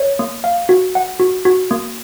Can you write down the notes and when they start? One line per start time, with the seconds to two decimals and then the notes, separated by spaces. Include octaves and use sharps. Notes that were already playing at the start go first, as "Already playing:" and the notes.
Already playing: C#5
0.19 A#3
0.44 F5
0.69 F#4
0.95 F#5
1.20 F#4
1.45 F#4
1.71 A#3